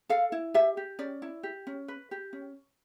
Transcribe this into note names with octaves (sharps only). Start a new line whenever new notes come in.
A4 F5
E4
G4 E5
G4
C#4 D5
E4
G4
C#4
B4
G4
C#4